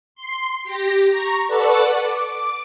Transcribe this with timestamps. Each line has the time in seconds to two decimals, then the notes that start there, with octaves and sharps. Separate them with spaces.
0.15 C6
0.64 G4 A#6
1.09 A#5 C#6
1.47 A4 B4 D5 F#5 A5 C#6
2.02 D6